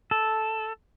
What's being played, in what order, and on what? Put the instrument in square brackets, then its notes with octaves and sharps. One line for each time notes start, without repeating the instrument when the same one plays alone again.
[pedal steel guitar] A4